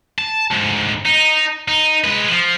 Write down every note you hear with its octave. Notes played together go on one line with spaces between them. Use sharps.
A5
D2 G#2
D#4
D#4
G#3 B4
F3